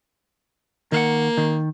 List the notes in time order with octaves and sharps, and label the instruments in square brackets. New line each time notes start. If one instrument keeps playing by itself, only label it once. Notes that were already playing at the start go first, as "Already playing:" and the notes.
[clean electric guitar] D#3 F5 F#5 [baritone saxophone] A#3
[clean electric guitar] D#3